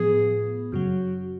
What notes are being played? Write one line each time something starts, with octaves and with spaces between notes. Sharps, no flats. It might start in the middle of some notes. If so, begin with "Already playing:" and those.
Already playing: A2 F3 B3 G#4
F#2 C#3 F#3 F#4